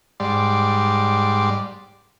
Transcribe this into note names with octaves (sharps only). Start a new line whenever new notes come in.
G#2 G3 D5 C6